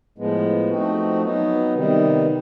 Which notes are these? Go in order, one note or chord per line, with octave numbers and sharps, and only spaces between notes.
A2 F3 G#3 B3
F3 A3 C4 D#4 F#4
F#3 B3 D#4
C3 D#3 G3 B3 D#4